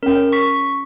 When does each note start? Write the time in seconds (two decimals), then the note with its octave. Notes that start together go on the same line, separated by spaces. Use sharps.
0.03 C#4 A#4 G5
0.32 C#6 B6